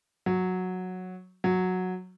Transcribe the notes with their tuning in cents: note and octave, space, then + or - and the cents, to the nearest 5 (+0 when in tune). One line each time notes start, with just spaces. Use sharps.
F#3 -10
F#3 -10